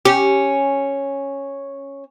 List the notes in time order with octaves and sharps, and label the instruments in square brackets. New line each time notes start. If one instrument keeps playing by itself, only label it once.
[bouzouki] C#4 [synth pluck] G4